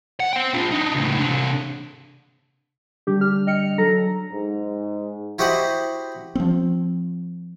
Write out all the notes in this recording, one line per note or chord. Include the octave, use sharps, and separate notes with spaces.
F#5
C5 G5
D4 F4
D4 D#4
C#2 A2
C3 D4
D3 G3 D4 G4
F6
D#5 G5 F6 C#7
F#3 D4 A4 A#5
G#2
E4 F#4 G4 C5 D#5 F#5
F3 C4